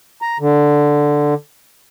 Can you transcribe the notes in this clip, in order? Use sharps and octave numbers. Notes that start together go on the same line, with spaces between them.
A#5
D3